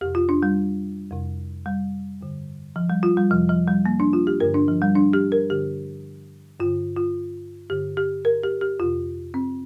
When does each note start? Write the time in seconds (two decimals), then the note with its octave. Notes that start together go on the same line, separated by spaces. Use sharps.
0.01 F2 C3 G4
0.15 F4
0.29 D4
0.43 G3
1.11 F2 C3
1.66 G3
2.21 G2 D3
2.76 F3
2.90 G3
3.03 F4
3.17 G3
3.30 F2 C3 F3
3.49 F3
3.68 G3
3.86 A#3
4.00 D4
4.13 F4
4.27 G4
4.40 G2 D3 A#4
4.54 D4
4.68 F3
4.82 G3
4.96 D4
5.13 G4
5.32 A#4
5.50 G2 D3 G4
6.60 G2 D3 F4
6.97 F4
7.70 G2 D3 G4
7.97 G4
8.25 A#4
8.43 G4
8.61 G4
8.80 F2 C3 F4
9.34 C4